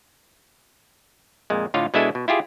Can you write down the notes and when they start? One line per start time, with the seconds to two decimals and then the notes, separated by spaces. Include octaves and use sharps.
1.50 F2 A#2 G#3
1.74 A2 D3 F4 C#5 D#5 F5
1.94 B2 G#3 D4 E4 A4 G#5
2.15 B2
2.28 E4 F4 G4 G#4